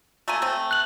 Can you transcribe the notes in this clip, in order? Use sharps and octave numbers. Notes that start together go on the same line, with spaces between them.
A3 A#3 G#5
A3 C4
F#6 F#7